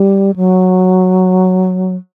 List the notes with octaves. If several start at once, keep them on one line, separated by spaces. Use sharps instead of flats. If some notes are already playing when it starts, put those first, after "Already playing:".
Already playing: G3
F#3